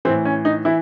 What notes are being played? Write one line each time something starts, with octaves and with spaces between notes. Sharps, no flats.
A2 E3 C4
C#4
D#4
E3 E4